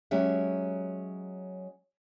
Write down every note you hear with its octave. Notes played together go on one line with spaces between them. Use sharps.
F#3 G#3 C#4 G4 E5